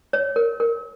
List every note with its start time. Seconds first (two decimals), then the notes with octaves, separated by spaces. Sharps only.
0.13 C#5
0.36 A#4
0.60 A#4